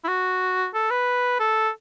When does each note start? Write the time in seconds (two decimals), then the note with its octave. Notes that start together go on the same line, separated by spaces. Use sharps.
0.04 E4
0.08 F#4
0.74 A4
0.91 B4
1.40 A4